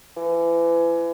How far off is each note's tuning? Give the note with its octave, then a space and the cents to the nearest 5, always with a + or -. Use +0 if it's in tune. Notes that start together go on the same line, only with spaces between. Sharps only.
E3 +35